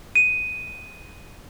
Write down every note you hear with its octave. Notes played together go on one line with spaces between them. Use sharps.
D#7